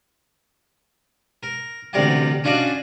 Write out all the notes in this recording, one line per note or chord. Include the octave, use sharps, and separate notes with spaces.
A#4
A1 D2 C3 A#4 D5 F#5
C#4 D4 F4 F#4 D5 D#5